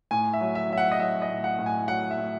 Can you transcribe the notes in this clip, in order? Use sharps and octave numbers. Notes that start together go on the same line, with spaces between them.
A2 G#5
E5
F#3
E5
F#3 E5
F#5
D#5
F#3 E5
D#5
A2
F#5
A2
G#5
F#3 F#5
E5
A2